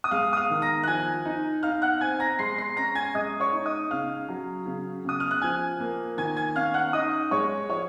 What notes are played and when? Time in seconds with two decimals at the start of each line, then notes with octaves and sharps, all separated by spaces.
0.04 D#6
0.11 G#3 F5 F6
0.33 D#6
0.37 F5 F6
0.50 D#3
0.62 A#5 A#6
0.83 F#6
0.87 F3 G#5 G#6
1.25 D#4
1.63 D#4 F5 F6
1.82 F#5 F#6
2.01 C4 G#5 G#6
2.20 A#5 A#6
2.39 G#3 C6 C7
2.54 A#6
2.58 C6 C7
2.77 C#4 A#5 A#6
2.95 G#5 G#6
3.14 G#3 D#5 D#6
3.40 C#5 C#6
3.52 D#4
3.65 D#5 D#6
3.91 C#3 F5 F6
4.29 F#3
4.66 C#3
5.04 C#3 D#6
5.20 F6
5.31 F#6
5.42 F3 G#5 G#6
5.80 A#3
6.17 D#3 G#5 G#6
6.36 G#5 G#6
6.55 C#4 F5 F6
6.74 F#5 F#6
6.93 D#4 D#5 D#6
7.31 G#3 C#5 C#6
7.69 F3 C#5 C#6